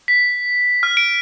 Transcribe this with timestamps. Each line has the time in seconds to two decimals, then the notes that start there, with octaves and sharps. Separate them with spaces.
0.08 B6
0.83 F6
0.97 D7